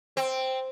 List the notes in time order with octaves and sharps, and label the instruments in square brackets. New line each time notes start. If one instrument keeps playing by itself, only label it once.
[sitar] C4